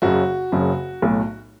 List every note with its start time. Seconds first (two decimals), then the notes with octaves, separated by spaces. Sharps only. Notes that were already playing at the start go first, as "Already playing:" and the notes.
0.02 F#1 F#2 C#3 F#4
0.52 F#1 F#2 C#3
1.02 B1 A2 F#3 A3